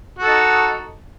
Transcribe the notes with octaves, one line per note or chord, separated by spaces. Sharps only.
D#4 F#4 A4